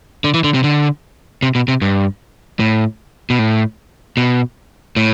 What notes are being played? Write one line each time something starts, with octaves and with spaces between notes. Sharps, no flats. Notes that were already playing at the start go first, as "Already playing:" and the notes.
D3
E3
D3
C3
D3
C3
B2
C3
G2
A2
B2
A2
B2
A2